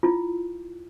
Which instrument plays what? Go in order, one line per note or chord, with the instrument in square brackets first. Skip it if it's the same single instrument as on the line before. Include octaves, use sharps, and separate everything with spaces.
[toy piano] E4 F4